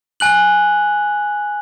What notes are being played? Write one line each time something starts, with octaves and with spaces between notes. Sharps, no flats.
G#5 F#6 F#7